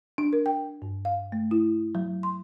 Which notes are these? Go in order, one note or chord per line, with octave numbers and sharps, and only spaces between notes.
D4
A#4
G5
G2
F5
A3
E4
F#3
C6